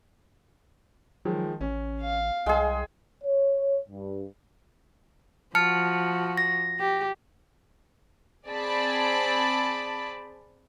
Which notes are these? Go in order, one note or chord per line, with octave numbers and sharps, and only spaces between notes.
D#3 F3 F#3 G#3
A1 C#4
F5
C2 G#3 G#4 G5
C#5
G2
F3 F#4 A5 F6 C#7
A#6
G4
C4 G#4 D5 A5 B5